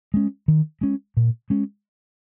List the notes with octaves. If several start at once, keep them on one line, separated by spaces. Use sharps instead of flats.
G#3 C#4
D#3
G#3 C#4
A#2
G#3 C#4